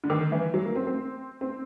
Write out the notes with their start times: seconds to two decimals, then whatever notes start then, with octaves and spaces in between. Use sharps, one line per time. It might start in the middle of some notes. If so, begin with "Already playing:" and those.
0.04 D3
0.10 D#3
0.32 E3
0.54 F#3
0.66 A#3
0.76 C4
0.87 C4
1.41 C4